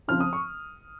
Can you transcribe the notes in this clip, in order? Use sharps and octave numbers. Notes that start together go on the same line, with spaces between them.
C#3 F3 C4 F4 F6
D#6
C#6